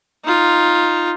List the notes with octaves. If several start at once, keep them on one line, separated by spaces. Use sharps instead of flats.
D#4 F4